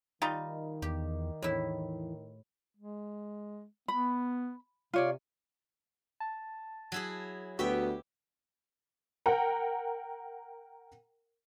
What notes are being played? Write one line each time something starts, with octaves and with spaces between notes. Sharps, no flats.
D#3 G3 D#4 F4
E2 G4
E2 A2 E4
G#3
B3 B5
C3 F4 C#5 D5
A5
F#3 E4 G#4
D2 B3 F#4 G4 E5 G5
A#4 F#5 G5 A#5